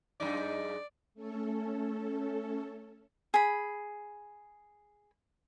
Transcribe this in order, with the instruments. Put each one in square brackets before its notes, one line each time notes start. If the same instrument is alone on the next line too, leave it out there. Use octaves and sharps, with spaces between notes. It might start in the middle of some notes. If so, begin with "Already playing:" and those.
[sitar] F#2 G#3 D#4 [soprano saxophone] D5
[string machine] A3 C#4 A4
[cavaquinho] G#4 B5